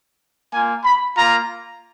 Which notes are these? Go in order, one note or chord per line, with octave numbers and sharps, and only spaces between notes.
A#3 F4 G#5
B5
A#3 F4 A#5